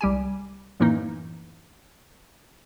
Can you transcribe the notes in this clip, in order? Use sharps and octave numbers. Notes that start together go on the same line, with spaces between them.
C2 G3 G4 G#5
F#2 A2 E3 A#3 D#4